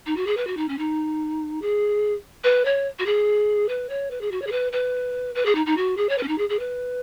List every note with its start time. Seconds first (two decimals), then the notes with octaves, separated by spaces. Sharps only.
0.06 D#4
0.16 F#4
0.26 G#4
0.37 B4
0.47 F#4
0.57 D#4
0.68 C#4
0.78 D#4
1.61 G#4
2.44 B4
2.65 C#5
2.99 F#4
3.06 G#4
3.68 B4
3.89 C#5
4.10 B4
4.21 G#4
4.31 F#4
4.41 C#5
4.47 G#4
4.51 B4
4.72 B4
5.35 B4
5.45 G#4
5.55 D#4
5.66 D#4
5.77 F#4
5.97 G#4
6.09 C#5
6.18 B4
6.23 C#4
6.28 D#4
6.38 G#4
6.49 G#4
6.59 B4